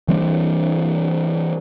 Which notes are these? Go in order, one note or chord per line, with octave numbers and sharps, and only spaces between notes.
E3 G3 C4